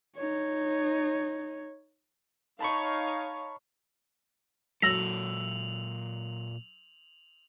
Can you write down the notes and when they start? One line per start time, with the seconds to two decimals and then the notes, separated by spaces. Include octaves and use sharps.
0.17 D#4 C#5
2.61 D#4 C#5 F5 A5 B5 C#6
4.82 A#2 F#3 A4 E6 A#6 F7 F#7